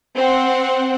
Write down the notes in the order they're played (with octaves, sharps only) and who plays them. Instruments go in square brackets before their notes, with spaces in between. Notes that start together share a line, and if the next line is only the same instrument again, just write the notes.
[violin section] C4 F#5